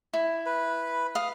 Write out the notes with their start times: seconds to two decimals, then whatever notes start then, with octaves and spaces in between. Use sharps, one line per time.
0.13 E4
0.46 B4
1.15 F5 D#6